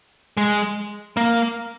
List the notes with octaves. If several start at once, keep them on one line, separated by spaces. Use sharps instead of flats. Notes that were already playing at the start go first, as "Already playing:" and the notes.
G#3
A#3